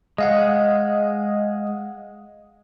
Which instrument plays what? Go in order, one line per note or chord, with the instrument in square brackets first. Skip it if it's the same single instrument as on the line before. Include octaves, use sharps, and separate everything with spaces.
[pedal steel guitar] G#3 [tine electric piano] D#5 F5 F#5